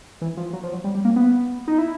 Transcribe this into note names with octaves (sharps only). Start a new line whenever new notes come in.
E3
F3
F#3
F3
F#3
G3
G3
A#3
B3
D#4
E4